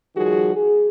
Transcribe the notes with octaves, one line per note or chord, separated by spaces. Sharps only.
D#3 F3 G3 F#4 G#4
G#4